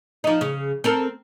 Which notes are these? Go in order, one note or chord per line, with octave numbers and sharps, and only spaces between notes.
F3 D#4
C#3
C4 A4 A#4